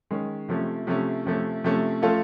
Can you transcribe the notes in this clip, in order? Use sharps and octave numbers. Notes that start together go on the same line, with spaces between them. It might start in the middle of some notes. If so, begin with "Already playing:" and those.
D#3 G#3 C#4
C3 F3 A3 C#4
C3 F3 A3 C#4
C3 F3 A3 C#4
C3 F3 A3 C#4
F3 A3 C#4 F4 A4